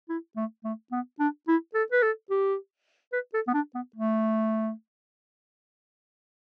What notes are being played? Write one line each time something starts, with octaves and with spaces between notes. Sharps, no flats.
E4
A3
A3
B3
D4
E4
A4
B4
A4
G4
B4
A4
B3
D4
B3
A3